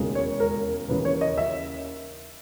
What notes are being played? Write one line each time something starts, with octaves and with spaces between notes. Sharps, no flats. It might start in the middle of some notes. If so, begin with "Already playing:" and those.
Already playing: E1 D#2 C#3 G#3
C#5
A#4
D#2 C#3 E3 B4
C#5
D#5
E5